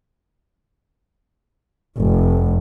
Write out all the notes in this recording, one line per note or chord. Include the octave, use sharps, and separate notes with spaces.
F1